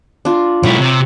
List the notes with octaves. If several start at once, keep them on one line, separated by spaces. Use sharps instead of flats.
D4 F4
B1 E4 C#5 F#5 A#5
C3